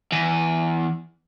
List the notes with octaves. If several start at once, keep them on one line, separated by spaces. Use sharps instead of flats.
E2